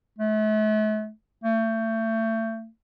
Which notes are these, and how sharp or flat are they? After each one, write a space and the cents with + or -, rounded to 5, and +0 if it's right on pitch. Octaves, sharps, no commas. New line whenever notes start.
A3 -40
A3 +30